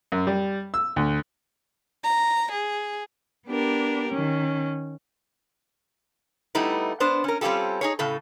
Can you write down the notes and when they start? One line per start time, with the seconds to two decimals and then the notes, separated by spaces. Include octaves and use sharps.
0.12 F#2
0.27 G3
0.74 E6
0.96 D2
2.04 A#5
2.52 G#4
3.47 B3 D4 G4 A#4
4.11 D#3 C#4
6.55 G3 A3 B3 D#4 E4
7.00 B3 D4 C5
7.24 C#4 A#4
7.41 G3 C4 C#4 F4 G4 A4
7.81 D#4 G#4 C#5
7.99 A2 C#3 A4